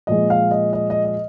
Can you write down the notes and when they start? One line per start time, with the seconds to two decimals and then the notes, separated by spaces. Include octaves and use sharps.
0.07 A#2 F3 G#3 D#5
0.30 F5
0.51 D#5
0.73 D#5
0.90 D#5
1.05 D#5